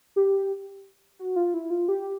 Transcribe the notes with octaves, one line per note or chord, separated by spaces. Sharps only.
G4
F#4
F4
E4
F4
G4